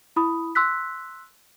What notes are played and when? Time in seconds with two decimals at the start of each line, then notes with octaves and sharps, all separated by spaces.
0.16 E4 B5 D#6
0.55 C6 E6 F#6 B6